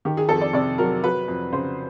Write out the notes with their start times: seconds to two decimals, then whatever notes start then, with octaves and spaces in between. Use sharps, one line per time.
0.05 D#3 G4
0.17 G#4
0.29 F2 A4
0.41 D5
0.53 C3 D5
0.78 F#3 A#4
1.04 F#3 B4
1.28 F2
1.53 C#3 C5